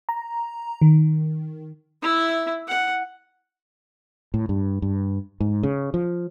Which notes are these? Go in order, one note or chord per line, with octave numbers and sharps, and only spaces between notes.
A#5
D#3
E4 E5
F#5
A2
G2
G2
G#2
C#3
F3